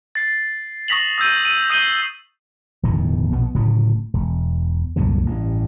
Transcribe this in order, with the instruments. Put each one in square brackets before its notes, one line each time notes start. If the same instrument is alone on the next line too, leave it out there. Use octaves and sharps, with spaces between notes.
[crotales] A6 C7
C#6 D#6 A#6 B6 F7 F#7
D#6 E6 G6 D#7
D#7
D#6 G6 C7 D#7 F#7 G7
[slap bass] D1 E2 B2 D#3
A#1 B2 B3
D1 A2 C#3 F#3
E1
C2 F#2 A#2 D3
A1 G2